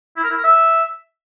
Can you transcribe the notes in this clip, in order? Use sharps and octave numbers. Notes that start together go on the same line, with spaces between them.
E4
A#4
E4
A#4
E5